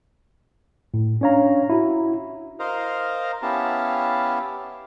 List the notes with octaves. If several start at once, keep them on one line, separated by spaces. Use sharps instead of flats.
A2
C#4 D4 C#5 F5 A#5
E4 F#4
A#4 C5 D#5 F5 A#5
B3 C#4 E4 G4 F5 A5